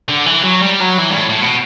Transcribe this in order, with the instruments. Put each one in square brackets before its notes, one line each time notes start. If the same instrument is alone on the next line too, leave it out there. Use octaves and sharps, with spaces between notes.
[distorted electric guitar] D3
E3
F#3
G3
F#3
E3
G2
A2
A2
B2